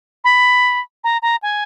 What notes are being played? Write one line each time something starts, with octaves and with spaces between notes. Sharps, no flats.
B5
A#5
A#5
G#5